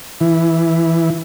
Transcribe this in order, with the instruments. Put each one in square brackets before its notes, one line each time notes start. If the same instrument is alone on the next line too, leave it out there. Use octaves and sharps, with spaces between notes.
[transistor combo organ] E3